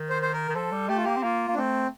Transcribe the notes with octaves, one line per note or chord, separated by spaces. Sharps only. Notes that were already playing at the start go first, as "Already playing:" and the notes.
Already playing: D#3
C5
C5
A#4
D#3
F3 A4
G3
A3 G4
F4
A#3 G4
C4
A#3 F4
A#3
D4
A3 C4